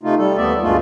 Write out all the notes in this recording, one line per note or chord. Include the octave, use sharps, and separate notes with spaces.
C3 A3 D#4 F4
G3 A4
D#2 A3 B3 D5 E5
D2 G2 G#3 A3 F4